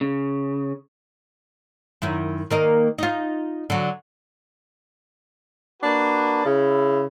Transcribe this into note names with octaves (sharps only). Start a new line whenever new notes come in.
C#3
F#2 D#3 E4
D#3 A#3 D#5
D#4 F4
D3 F#3
A#3 D4 F#4 B4
C#3 E4